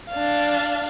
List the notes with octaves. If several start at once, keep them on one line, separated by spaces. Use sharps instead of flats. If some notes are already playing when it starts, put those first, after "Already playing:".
D4 F5